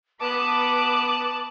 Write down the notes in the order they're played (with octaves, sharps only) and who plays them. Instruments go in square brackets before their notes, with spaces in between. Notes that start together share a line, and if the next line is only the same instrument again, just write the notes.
[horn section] B3 [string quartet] B4 D#6 F#6 [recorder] A5 [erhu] D6